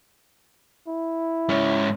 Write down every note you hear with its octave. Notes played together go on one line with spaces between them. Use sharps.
E4
G#2 C#4